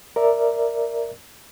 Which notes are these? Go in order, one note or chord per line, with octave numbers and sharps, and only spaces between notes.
A#4 D5 E5